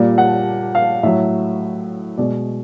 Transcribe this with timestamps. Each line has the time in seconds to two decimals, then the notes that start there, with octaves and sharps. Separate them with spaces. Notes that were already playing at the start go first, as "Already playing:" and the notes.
Already playing: A#2 G3
0.18 F#5
0.75 F5
1.03 A2 F#3 E5
2.18 B2 G#3 D5